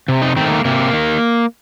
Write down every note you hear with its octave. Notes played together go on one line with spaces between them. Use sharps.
C3
D#4
D#3 A3 C4
A#3
C3 A#3
D#3